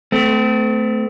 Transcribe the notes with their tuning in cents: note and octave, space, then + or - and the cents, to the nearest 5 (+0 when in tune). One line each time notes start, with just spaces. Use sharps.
A3 +0 C4 -35